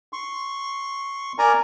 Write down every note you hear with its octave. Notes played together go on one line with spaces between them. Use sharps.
C6 C#6
A#4 D5 G#5 A#5